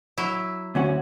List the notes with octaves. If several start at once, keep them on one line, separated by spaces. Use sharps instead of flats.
F#3 E4
D2 C#4 F#4